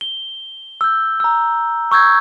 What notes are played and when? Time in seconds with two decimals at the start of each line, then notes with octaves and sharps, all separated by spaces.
0.01 G7
0.81 E6 G6
1.20 A#5 E6
1.91 C#6 E6 G6 G#6